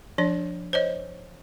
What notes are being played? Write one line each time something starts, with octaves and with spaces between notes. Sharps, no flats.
F3 D4 D5
C5 C#5 D#5